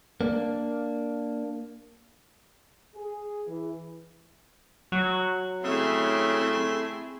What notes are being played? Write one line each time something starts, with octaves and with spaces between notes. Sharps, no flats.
A#3 D4
G#4
E3
F#3 F#4
C#3 A3 C4 E4 G#4 E5 C6